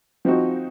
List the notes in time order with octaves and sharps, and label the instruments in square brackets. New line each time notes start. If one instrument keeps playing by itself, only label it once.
[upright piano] F3 C4 D#4 F#4